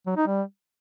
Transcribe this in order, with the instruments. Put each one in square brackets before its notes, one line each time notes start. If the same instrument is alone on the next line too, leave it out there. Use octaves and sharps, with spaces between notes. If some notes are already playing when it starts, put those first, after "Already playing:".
[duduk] F#3
D#4
G3